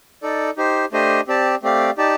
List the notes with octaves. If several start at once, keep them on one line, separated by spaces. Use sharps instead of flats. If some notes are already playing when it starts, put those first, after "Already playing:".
D#4 A4 D5
D#4 G4 C5
A3 D4 G4 C5 D#5
C4 G4 D5 A5
A3 C4 G4 D5 F5
D#4 G4 D5 A5